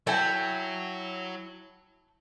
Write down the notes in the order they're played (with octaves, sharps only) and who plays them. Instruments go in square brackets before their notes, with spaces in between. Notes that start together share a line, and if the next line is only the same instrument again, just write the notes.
[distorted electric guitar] F#3 [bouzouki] E4 [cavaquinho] A4 G5 G#5